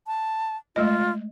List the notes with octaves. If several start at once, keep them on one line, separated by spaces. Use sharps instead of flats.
A5
G#3 A3 F4 D#5